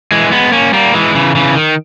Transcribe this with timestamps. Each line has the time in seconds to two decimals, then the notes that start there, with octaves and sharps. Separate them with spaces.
0.12 E3 G#3
0.32 G#3 B3
0.52 A#3 C#4
0.73 G3 A#3
0.94 E3 G#3
1.15 C#3 E3
1.35 C#3 E3
1.55 D#3